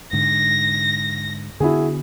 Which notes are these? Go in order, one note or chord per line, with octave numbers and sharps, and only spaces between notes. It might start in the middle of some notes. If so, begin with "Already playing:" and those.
G#2 D3 A#6
D3 B3 E4 F#4 G#4